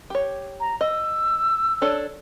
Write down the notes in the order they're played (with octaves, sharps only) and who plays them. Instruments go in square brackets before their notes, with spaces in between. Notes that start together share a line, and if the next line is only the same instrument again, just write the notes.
[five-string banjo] G4 C#5
[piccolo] A#5
[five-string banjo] D#5 [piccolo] E6
[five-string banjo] D4 A4 C#5